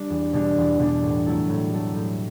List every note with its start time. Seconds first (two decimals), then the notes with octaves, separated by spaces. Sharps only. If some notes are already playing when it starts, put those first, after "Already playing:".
Already playing: G3 D4
0.10 E2
0.33 B2 G3 D4
0.57 E2
0.79 B2 G3 D4
1.03 A2
1.26 F#3 A3 E4 A4
1.49 A2
1.72 F#3 A3 E4 A4
1.96 A2